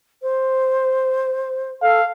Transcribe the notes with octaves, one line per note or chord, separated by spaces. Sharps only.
C5
A4 F5